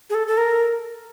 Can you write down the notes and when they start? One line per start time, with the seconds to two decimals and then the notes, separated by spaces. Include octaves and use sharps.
0.10 G#4
0.14 A4
0.27 A4
0.37 A#4